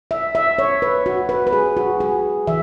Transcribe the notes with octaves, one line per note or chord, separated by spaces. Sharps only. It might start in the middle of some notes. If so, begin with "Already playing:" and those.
E5
E5
C#5
B4
F#4
B4
B4
G#4
F#4
G#4
E3 E5